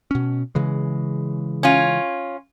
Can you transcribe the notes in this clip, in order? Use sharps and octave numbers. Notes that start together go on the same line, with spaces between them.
B2 C#4
C#3 E3 G#3
C#4 F4